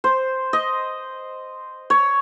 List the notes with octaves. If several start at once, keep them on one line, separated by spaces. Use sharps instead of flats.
C5
D#5
C#5